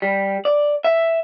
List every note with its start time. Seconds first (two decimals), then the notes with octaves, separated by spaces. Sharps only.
0.02 G3
0.45 D5
0.84 E5